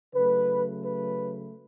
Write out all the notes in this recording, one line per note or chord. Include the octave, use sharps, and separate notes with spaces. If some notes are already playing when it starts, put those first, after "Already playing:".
C#3 F#3 A3 B4
B4